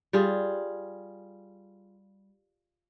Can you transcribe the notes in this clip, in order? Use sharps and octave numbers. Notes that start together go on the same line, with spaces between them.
G3 F4 G#4